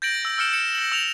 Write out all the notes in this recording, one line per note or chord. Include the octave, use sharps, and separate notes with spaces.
G6 A6 A#6 D7 F#7
E6 A#6
E6 F6 C#7 E7
C#7 E7
A#6 F#7
E6 E7 F7